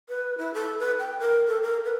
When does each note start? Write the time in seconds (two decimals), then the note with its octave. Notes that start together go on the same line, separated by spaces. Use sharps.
0.09 B4
0.38 E4
0.54 A4
0.79 B4
0.99 G5
1.20 A#4
1.48 A4
1.62 A#4
1.85 B4